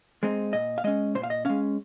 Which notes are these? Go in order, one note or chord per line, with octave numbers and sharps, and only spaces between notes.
G#3 C4 D#4
A#2 D#5
F5
G#3 C#4 D#5
A#2 C5
F5
D#5
G#3 C#4 F5